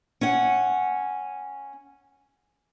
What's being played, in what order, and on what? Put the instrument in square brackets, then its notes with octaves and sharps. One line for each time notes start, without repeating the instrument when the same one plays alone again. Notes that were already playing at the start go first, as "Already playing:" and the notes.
[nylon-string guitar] C#4 F#5